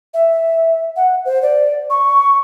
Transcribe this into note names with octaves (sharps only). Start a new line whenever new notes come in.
E5
F#5
C5
D5
C#6